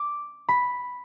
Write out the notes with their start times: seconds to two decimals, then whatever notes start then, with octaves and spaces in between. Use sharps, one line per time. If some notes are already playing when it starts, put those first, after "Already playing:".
Already playing: D6
0.49 B5